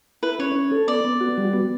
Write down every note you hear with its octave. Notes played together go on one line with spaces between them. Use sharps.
E4 B4
C#4 C#5
C#4
A4
B3 D5
B3
F#4
G3
B3